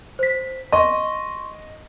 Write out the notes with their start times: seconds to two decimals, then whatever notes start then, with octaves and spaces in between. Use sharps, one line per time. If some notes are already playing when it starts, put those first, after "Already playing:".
0.19 C5 B6
0.72 D#5 C6 C#6